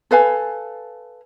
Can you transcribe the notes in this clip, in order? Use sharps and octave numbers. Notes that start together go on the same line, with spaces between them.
A4 B4 F5 G#5